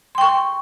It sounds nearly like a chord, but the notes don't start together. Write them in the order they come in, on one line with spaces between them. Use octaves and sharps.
C6 G5 C#6